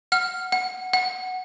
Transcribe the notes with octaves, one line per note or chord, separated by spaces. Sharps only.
F#5 F6
F#5
F#5